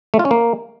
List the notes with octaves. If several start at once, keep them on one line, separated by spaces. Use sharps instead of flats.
A3
F4
C#4
A#3